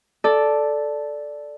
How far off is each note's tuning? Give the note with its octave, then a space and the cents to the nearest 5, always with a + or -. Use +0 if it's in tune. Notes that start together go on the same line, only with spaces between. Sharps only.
A4 -5 D5 +0